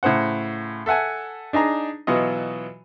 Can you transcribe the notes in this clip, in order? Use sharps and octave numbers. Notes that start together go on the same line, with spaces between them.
A2 C#3 C5 F#5
A4 E5 F#5 G#5
D4 D#4 G#4 A#5
B2 E3 F#3 F4 D#5